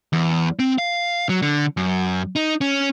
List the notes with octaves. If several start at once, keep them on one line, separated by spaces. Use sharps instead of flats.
E2
C4
F5
F#3
D3
F#2
D#4
C#4